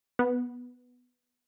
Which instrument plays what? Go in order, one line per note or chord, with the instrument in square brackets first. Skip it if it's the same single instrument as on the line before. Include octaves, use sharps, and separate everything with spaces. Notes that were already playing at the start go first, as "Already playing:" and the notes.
[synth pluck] B3